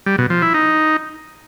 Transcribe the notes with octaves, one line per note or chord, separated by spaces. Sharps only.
G3
B2
F3
E4
D#4